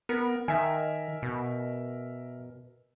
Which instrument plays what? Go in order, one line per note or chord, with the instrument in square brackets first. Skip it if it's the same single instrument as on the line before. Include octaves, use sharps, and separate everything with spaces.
[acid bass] B3 [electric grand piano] A#4
[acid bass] D#3 [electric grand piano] A#4 E5 [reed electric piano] G#5
[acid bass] B2